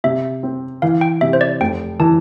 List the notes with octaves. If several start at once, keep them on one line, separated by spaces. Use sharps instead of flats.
C3 E5
C4
E3 F5
G5
C3 E5
C5
D5
F1 G5
E3 A5